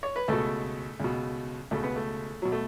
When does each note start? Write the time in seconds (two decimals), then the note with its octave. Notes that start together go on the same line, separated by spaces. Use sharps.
0.03 C#5
0.16 B4
0.28 C#2 B2 A3 A4
1.00 C#2 B2
1.71 C#2 B2 A3
1.84 B3
1.96 A3
2.42 B2 F#3
2.52 A3